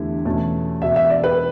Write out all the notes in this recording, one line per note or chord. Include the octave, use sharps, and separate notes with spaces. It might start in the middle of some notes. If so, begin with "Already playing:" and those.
Already playing: E2 D3 A3 E4 G4
E2 B2 A3 C#4
E1 E2 B2 E5
E5
D5
B4